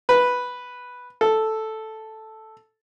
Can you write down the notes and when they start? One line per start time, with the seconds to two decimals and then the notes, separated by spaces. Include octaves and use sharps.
0.09 B4
1.21 A4